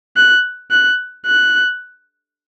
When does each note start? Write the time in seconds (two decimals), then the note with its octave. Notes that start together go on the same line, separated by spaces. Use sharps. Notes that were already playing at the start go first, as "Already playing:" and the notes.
0.17 F#6
0.71 F#6
1.27 F#6